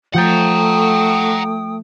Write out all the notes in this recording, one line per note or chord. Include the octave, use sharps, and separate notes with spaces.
F3 A3 F#5 G5 A#5 D#6 G6 A6